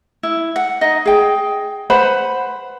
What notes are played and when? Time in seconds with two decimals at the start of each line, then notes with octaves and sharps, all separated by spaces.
0.23 E4
0.56 F#5
0.81 D#4 D#5
1.06 G#4 G5
1.90 B4 C5 F#5 B5